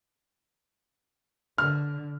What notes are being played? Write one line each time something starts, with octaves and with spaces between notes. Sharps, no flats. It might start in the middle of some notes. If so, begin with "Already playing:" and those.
D3 F6